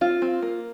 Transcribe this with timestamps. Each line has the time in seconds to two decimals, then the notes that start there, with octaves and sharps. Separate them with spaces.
0.01 C4 F4
0.22 C4
0.42 A#3